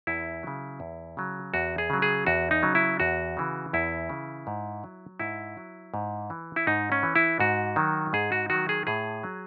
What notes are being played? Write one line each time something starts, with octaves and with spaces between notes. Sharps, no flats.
E2 E4
C#3 F#3
E2
C#3 F#3
E2 F#4
G#4
C#3 F#3
G#4
E2 F#4
D#4
C#3 F#3
E4
E2 F#4
C#3 E3
E2 E4
C#3 E3
G#2
F#3
G#2 E4
F#3
G#2
E3
E4
G#2 D#4
C#4
E3
E4
G#2 F#4
D#3 F#3
G#2 G#4
F#4
D#3 F#3 F#4
G#4
A2 G#4
F#3